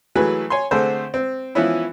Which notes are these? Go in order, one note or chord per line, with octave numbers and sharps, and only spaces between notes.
E3 F#3 A3 G#4 B4
C#5 G#5 C6
D3 A3 C4 G#4 C5
C4
E3 F3 B3 C#4 E4